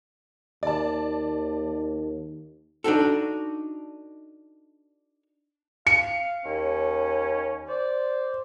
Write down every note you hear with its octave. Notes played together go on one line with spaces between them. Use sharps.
D#2 D5 A5
D4 D#4 F#4 A4
F5 C#7
D#2 C#4
C5 D5